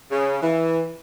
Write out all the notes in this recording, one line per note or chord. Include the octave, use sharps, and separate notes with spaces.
C#3
E3